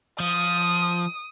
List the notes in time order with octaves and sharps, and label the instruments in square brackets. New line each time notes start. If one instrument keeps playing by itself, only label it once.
[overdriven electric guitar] F3 [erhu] D#6